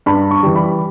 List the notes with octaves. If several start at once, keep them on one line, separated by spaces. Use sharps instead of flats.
G2 B5
C#6
E3 G3
B5